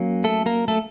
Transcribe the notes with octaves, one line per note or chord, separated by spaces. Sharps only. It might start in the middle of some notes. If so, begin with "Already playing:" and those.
Already playing: F#3 A#3 C#4
A3 A4
A#3 A#4
A3 A4